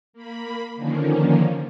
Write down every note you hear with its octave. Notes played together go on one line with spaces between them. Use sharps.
A#3 B5
D3 D#3 F3 A#3 C#4